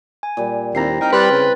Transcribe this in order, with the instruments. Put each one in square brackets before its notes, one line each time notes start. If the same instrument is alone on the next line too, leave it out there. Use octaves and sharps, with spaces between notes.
[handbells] G#5
[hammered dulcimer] A#2 G3
[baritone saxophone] D#2 [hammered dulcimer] C4 E4 A#5 [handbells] A#6 C7
[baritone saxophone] D#4 [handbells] G5 F6
[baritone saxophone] G3 [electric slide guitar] B4 [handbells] C6 F#6 A6
[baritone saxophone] C#3